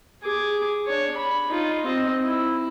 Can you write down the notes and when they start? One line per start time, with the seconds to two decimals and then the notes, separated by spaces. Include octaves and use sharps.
0.22 G#4 D6
0.86 D4 C#5
1.17 B5
1.49 D#4 F4
1.86 C4 D#5
2.22 E4